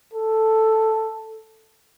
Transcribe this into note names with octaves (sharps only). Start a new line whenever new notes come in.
A4